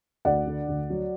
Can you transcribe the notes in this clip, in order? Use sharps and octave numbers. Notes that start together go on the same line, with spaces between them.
D2 D5 F#5
D3
D2
F#3